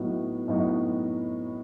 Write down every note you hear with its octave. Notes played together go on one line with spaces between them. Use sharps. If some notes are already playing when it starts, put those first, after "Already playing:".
Already playing: A2 F#3 B3 D#4 F#4
A2 F#3 B3 D#4 F#4